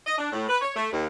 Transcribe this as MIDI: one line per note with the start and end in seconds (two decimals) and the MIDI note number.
0.05 0.17 75
0.18 0.29 62
0.32 0.47 45
0.49 0.59 71
0.61 0.74 73
0.76 0.88 57
0.92 1.07 39